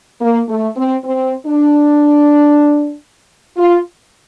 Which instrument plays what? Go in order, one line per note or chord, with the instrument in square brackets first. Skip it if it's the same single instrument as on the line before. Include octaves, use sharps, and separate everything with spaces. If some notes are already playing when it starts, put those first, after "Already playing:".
[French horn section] A#3
A3
C4
C4
D4
F4